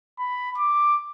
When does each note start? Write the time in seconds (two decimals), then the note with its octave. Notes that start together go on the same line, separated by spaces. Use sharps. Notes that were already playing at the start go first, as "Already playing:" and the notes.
0.19 B5
0.57 D6